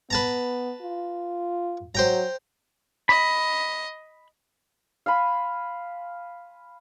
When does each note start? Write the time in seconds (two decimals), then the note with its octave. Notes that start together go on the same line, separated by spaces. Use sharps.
0.10 B3 B4 A5 A#5
0.82 F4
1.95 F#3 C5 G5 A#5
3.09 D#5 B5
5.06 F5 G#5 B5 C6